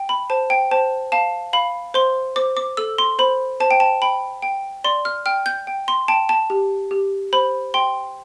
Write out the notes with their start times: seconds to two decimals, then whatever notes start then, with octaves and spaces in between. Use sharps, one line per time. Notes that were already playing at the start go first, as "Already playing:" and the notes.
Already playing: G5
0.09 B5
0.30 C5 A5
0.50 G5
0.71 C5 A5
1.12 F5 A5
1.53 F5 B5
1.94 C5 C6
2.36 C5 D6
2.57 D6
2.77 A4 E6
2.98 C6
3.19 C5 B5
3.60 C5 A5
3.71 G5
3.80 A5
4.02 G5 B5
4.42 G5
4.84 D5 C6
5.05 F6
5.26 G5 F6
5.46 G6
5.67 G5
5.88 C6
6.08 G5 A5
6.29 A5
6.50 G4
6.91 G4
7.33 C5 B5
7.74 G5 C6